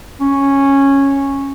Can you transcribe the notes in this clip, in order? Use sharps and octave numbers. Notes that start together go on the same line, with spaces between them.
C#4